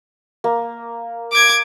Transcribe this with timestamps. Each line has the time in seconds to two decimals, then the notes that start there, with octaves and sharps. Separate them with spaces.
0.44 A#3
1.32 D6 G#6